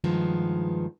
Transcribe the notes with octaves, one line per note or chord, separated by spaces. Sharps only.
G2 D#3 F3 G#3 B3